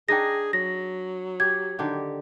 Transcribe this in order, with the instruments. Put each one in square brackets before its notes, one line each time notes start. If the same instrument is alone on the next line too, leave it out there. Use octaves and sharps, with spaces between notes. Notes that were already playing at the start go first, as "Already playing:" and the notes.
[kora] D4 D#4 D#5 [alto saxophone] G#4 [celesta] G5 A#6
[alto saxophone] F#3 [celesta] A#6
[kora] G4 [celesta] G#6
[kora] D3 D#3 G4